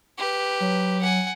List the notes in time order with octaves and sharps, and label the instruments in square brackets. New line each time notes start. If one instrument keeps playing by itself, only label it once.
[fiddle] G4 B4
[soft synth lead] F#3
[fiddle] F#5 G#5